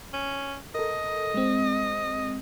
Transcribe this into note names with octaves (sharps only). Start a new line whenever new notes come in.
C#4
A4 A#4 D#5
G#3 C4